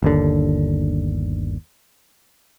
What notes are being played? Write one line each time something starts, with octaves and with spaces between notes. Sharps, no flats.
G1 D#2 D3